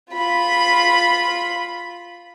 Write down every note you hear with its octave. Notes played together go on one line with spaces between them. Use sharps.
F4 B5